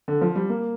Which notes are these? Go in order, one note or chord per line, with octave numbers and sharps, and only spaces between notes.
D3
F3
G3
A#3